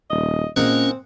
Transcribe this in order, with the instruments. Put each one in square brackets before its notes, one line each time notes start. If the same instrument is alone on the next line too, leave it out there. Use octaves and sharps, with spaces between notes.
[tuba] D#1 [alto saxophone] D#5
[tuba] A#2 [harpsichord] G#3 A#3 F#5 [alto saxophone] C4 [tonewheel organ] C#4